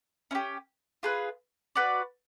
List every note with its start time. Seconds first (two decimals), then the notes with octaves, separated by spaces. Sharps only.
0.31 C#4 E4
0.35 G4
1.03 F4 G#4 B4
1.76 F#4 B4 D5